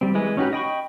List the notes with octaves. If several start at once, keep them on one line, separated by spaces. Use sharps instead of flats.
G3 C4
E3 G#3 B4
C#4 D#4 F#4 G4 B4
D#5 G5 B5 C#6